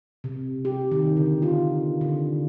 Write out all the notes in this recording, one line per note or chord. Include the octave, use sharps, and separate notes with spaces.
C3
G4
D#3
D3
F4
D3